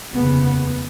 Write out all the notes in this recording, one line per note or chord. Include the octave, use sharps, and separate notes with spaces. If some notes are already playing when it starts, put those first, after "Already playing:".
F1 D#2 C#3 B3